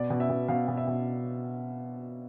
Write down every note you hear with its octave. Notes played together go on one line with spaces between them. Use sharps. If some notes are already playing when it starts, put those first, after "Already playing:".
Already playing: B2 D5
B2
E5
B2
B2 F5
B2
E5
B2